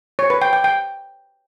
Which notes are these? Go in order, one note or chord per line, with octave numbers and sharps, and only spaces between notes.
C#5
B4
G5
G5
G5